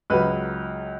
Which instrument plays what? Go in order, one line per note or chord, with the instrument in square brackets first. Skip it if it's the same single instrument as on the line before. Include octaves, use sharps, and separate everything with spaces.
[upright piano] C#2 C#3 F#3 B4